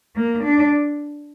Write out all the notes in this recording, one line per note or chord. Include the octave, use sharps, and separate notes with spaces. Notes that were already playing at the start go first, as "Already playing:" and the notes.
A#3
D4